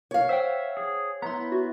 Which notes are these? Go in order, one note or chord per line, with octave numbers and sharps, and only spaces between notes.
C#5 F5
C5 E5 F#5 G5
G#4
B3 E4 A#5 C6
F#4